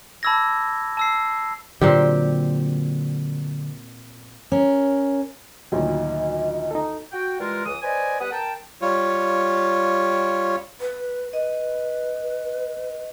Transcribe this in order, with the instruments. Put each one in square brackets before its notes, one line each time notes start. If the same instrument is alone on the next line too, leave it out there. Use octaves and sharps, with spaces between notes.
[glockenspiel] A5 B5 D6 E6 G#6 A#6
A5 E6 C7
[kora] A#2 C4 G4 [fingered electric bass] D3 F#3
[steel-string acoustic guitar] C#4 A#4
[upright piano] D2 A#2 D#3 [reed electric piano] F#3 [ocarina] D#5
[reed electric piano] D#4 A4
[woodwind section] F#4 G5
E3 G3 G#3 F4 A#4
C#2 E3 D#6
B4 C5 D5 D#5 G#5
G3 B3 B4 F#5 D#6
A#4 G5 A5
[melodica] G3 F4 C#5
[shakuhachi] B4
[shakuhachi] B4 [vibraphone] D#5